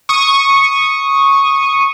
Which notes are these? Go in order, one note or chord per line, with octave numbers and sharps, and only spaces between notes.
C#6 D#6